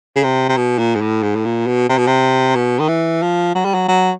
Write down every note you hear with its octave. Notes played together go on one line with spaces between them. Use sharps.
C#3
C3
C3
B2
A#2
G#2
A2
G#2
A2
A#2
B2
C3
B2
C3
B2
D#3
E3
F3
F#3
G3
F#3
F#3